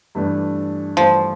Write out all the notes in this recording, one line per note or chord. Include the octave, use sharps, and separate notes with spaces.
G2 E3 A3 D4 A4
G2 E3 F3 A3 D4 A4